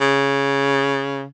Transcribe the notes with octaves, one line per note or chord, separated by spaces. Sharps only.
C#3